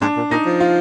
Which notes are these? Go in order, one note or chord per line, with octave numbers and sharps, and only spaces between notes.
G#2 D4
A#2
A#2 D#4
F3
F4